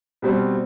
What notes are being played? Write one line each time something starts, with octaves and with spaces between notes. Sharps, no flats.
B2 G3 C4